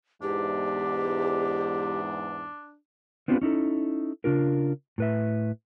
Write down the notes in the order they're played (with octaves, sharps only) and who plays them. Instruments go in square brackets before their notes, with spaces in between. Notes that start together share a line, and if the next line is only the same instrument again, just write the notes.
[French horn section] E2 G#2 [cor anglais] D4 [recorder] G4
[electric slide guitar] B3 C4 D4 F4 G4 B4
C#4 D#4 E4 A4
C#3 D4 F4 A#4
A2 B4 E5